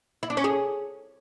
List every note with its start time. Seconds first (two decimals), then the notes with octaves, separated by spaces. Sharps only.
0.23 E4
0.30 D4
0.37 C#4
0.44 G#4